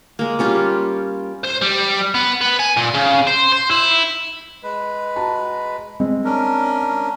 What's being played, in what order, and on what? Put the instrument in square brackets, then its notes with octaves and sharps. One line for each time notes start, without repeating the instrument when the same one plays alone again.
[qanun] G#3 A#3
G3 C#4 F4 G4
[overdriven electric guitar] C5
G3
B3
B3
G#5
A#2
C#3
C5
C5
E4
[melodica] G#3 B4
[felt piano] F#4 A5 A#5
G#3 C4 D#5
[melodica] C#4 D4 A#4